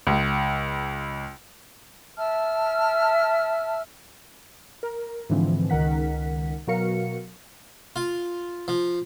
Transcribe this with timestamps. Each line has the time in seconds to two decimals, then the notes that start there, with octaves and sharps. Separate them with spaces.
0.07 C#2
2.17 E5 A5 E6 F6
4.83 A#4
5.30 G#2 D3 E3 F3 C4
5.70 C#2 D#3 A#4 F#5 B6
6.67 B2 F#3 F#4 A#4 F5 C#7
7.96 F4
8.68 F3